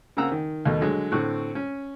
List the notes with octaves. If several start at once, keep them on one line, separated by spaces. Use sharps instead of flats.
C#3 A#3 C4 F#5 A#5 E6
D#3
D#2 B2 A3
D3 F#3 G#3
A2 D3 C4 C#6 F#6
C#4